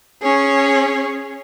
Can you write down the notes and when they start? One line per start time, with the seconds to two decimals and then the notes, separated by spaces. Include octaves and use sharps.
0.22 C#4 G#4 C#5